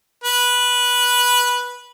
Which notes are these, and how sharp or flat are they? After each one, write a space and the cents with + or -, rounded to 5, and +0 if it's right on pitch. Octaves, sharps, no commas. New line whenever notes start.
B4 -10